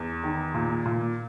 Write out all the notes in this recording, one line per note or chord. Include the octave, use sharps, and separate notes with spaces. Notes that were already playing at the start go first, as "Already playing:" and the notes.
Already playing: E2
D#3
A#2
A#2